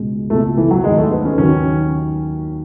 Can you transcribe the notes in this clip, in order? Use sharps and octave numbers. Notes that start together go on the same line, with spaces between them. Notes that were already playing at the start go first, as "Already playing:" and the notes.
Already playing: C#2 B2 G#3 B3
C#2 B2 G#3 A3 B3
E3
F#3
D#2 D#3 F#3 G#3
A3
B3
C#4
D#2 D#3 F#3 C#4